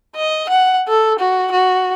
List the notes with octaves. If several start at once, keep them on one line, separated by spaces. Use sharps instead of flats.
D#5
F#5
A4
F#4
F#4